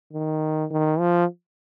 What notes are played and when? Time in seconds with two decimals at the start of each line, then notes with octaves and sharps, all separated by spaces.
0.13 D#3
0.71 D#3
0.99 F3